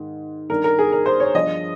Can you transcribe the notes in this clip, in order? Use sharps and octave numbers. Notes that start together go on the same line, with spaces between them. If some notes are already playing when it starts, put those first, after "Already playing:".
Already playing: G#2 D#3
G2 D#3 A#4
A#4
G#4
A#4
C5
C#5
G2 F3 D#5